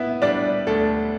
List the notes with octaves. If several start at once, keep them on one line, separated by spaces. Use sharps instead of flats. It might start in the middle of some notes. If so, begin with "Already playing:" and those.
Already playing: B3 E4 E5
G3 D4 D5
D2 A4